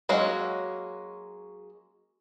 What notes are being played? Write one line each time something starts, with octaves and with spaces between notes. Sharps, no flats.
F#3 G#3 A#3 C#4 F#4